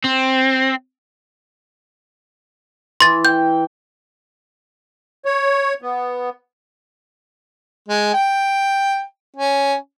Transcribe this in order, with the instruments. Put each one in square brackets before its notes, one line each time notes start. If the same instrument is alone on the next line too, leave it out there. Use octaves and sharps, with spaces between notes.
[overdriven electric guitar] C4
[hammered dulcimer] E3 [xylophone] C6 A6
[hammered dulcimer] G5 [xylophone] G6
[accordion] C#5
B3
[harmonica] G#3
G5
C#4